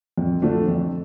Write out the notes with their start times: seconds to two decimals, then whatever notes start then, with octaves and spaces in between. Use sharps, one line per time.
0.18 F2
0.42 D3 F3 A3 D4
0.68 F2